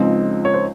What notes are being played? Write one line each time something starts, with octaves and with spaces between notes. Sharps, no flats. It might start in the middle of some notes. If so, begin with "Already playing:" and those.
Already playing: C#2 C#3 F3 C4 D#4
C#5
C5